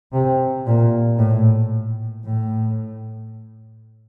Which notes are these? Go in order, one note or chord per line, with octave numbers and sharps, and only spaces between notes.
C3
A#2
A2
A2